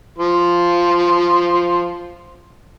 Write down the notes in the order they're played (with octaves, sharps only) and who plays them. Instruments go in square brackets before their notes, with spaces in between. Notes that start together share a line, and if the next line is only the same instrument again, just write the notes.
[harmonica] F3 C6